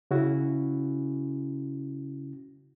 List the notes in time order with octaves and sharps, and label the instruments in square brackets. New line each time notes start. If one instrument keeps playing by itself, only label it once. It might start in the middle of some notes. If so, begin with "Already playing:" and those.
[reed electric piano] C#3 C#4 E4 F#4